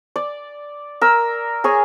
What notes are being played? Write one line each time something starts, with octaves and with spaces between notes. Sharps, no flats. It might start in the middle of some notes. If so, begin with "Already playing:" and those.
D5
A#4 E6
G#4 C#5 G#5